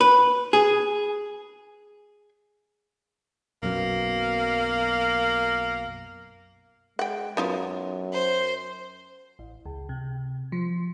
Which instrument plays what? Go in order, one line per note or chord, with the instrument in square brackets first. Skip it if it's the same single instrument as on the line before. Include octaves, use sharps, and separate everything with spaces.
[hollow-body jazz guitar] B4
G#4
[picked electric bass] B1 F#2 B2 [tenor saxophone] A#3
[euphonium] G#3 [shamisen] F#5 G5
[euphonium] F#2 [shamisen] B3 D#4 F4
[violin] C5
[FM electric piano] A1
C#2
C3
F3